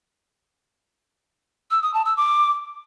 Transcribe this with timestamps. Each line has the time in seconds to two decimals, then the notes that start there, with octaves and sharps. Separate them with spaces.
1.71 E6
1.82 D#6
1.94 A5
2.05 E6
2.17 D6